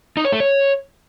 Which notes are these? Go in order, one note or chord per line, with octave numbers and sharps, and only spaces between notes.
D#4
C#5
A3
C#5